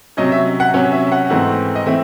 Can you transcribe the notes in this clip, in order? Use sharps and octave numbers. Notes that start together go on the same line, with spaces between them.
C3 F#3 C#4 D#5
E5
F#5
C3 F#3 C#4 C#5
E5
E5
F#5
G#2 E3 A3 C4
D#5
E3 A3 C4 E5